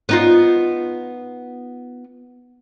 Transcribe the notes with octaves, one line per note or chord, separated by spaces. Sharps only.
B3 D#4 F4